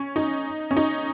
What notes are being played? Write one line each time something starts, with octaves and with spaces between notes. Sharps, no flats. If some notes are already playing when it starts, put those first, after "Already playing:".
Already playing: C#4
D#4
C#4
D#4